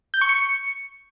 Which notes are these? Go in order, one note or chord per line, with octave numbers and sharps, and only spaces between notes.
G6
C#6
C#7